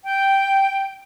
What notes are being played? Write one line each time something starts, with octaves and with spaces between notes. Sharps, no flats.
G5